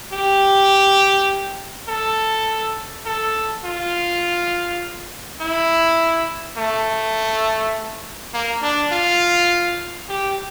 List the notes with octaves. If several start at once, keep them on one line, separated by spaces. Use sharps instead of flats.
G4
A4
A4
F4
E4
A3
A#3
D4
F4
G4